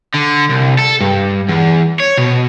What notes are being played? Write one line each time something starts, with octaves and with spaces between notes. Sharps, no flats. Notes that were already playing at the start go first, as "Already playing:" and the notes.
D3
C2
A4
G2
E2
C#5
B2